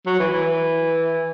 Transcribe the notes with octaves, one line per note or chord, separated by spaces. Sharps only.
F#3
E3
E3